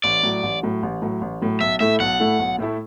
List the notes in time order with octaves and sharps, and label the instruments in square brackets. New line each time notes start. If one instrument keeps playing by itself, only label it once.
[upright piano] A1 [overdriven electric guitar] D5
[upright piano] A2 F#3
A1
A2 F#3
A1
A2 F#3
A1
A2 F#3
[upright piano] B1 [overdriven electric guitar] E5
[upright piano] A2 A3 E4 A4 [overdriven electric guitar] E5
[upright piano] B1 [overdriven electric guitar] F#5
[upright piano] A2 A3 E4 A4
B1
A2 A3 E4 A4